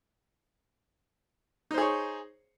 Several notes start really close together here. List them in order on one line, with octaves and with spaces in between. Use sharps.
D#4 C5 G#4 C#5